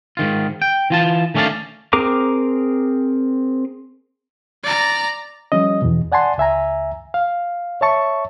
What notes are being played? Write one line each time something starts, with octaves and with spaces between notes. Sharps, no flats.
G#2 D#3 F4
G5
E3 F4 A5
D#3 A3 C#4 D4 F5 A5
C4 G#4 A#4 A#5 D6
D5 A#5
F3 G3 C#4 D#5
E2 B2
D5 F#5 G#5 A5 C6
C#2 E5 G#5 A#5
F5
C#5 E5 A5 C#6